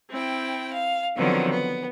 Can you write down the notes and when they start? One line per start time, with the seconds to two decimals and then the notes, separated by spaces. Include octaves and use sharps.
0.11 C4 E4 G5
0.72 F5
1.17 D3 D#3 F3 F#3 B3 C4
1.52 B3